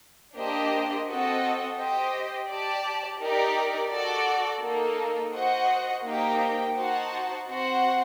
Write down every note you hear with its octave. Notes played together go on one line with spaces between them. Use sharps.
A#3 D4 G4 C5 D#5
C4 F#4 A4 D#5
G4 C5 D#5 G5
G4 D5 A5
D#4 G4 A#4 D5
F#4 A4 D5
A#3 D#4 A4
F#4 C5 D#5 F#5
A#3 D#4 G4 C5 G5
D#4 F#4 C5 F#5 A5
C4 F#4 C5 F#5